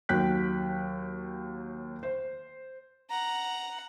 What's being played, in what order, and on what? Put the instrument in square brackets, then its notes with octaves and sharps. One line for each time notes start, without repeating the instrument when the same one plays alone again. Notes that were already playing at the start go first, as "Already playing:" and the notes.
[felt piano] D#2 F#3 G5 F#6 B6
C5
[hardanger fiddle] F#5 A#5